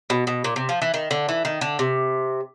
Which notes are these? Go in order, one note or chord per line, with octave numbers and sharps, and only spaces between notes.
B2
B2
A#2
C3
F3
E3
D#3
D3
E3
D#3
D3
C3